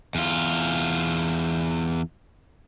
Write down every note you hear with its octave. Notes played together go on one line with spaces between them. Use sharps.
E2 F4